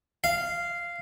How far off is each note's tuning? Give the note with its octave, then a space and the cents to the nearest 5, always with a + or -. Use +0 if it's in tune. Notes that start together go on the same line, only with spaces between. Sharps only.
F5 -10